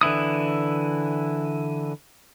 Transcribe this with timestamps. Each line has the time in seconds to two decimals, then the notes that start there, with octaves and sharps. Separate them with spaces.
0.01 D3 E3 E4 D#6